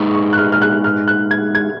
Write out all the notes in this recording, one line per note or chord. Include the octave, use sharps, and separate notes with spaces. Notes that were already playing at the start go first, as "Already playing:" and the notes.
Already playing: G#3 D#4 G#4 B4 C#6 D#6
C#6
F#6
F6
F6
F#6
F6
F#6
G#6
G#6